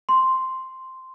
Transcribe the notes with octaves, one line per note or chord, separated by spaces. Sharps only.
C6